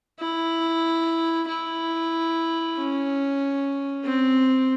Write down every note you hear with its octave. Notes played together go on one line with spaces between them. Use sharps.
E4
E4
C#4
C4